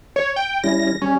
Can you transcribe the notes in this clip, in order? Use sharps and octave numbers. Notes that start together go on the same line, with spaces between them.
C#5
G5
G3 C#4 E4 A#6
G3 C#4